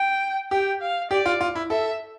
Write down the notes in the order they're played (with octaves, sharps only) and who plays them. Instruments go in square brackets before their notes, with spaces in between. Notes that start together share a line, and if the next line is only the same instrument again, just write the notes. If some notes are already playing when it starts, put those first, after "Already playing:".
Already playing: [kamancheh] G5
[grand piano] G4 [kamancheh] G5
[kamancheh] F5
[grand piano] G4 [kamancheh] D5
[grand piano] F4
F4
E4
[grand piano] A4 [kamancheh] E5